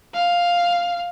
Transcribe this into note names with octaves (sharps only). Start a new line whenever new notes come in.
F5